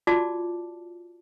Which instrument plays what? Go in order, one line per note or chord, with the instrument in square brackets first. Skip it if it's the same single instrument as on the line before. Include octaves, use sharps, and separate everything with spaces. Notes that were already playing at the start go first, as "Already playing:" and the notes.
[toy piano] F4 F#4 D5 A5 D6